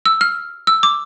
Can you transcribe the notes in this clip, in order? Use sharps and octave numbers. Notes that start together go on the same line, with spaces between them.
E6
F6
E6
D6